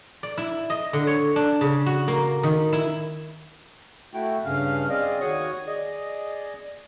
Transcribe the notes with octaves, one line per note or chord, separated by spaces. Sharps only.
D5
E4
D#5
D3
C#5
D4
C#3
F#4
A#3
D#3
E4
A3 E4 F#4 G5
G2 C#3 C#4 F5 F6
C4 G#4 D5 D#5 F5
D#2 F#4 C#5 C#6 D#6
G#4 D5 D#5